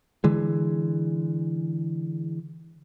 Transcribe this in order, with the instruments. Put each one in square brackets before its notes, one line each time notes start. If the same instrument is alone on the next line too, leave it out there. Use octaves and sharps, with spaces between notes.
[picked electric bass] D3 E3 G#3